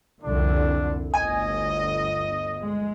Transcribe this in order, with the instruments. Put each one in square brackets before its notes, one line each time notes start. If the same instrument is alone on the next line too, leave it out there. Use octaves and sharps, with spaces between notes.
[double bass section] C2 F2 D3 [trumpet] D4
[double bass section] G1 D2 [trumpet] D#5 [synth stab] G#5
[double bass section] G#3